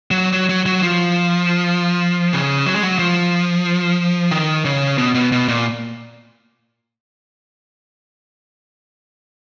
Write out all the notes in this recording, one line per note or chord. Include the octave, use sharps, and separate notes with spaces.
F#3
F#3
F#3
F#3
F3
C#3
F#3
G#3
F#3
F3
D#3
C#3
B2
B2
B2
A#2